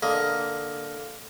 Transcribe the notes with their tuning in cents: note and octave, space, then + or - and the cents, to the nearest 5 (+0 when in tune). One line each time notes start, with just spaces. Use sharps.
D3 +0 A#3 +0 D#5 +10